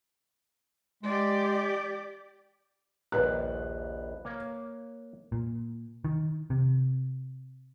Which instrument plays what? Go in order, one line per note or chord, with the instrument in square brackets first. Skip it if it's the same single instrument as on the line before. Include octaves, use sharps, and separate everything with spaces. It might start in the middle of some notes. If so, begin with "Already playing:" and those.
[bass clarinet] G#3 [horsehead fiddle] G4 D5
[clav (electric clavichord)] A#1 D#2 [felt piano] B4 F#6
[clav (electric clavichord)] A#3 C#5 F5
[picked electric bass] A#2
D#3
C3